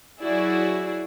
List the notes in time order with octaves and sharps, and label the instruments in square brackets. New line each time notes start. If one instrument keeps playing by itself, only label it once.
[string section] F#3 E4 F#4 G#4 D5